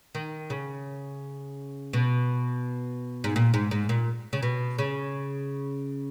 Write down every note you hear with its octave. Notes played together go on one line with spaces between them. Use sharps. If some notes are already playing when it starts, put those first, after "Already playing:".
D#3
C#3
B2
G#2
A#2
G#2
G#2
A#2
C#3
B2
C#3